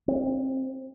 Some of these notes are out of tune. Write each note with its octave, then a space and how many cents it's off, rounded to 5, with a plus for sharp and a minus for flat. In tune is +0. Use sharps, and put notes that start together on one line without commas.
C4 +20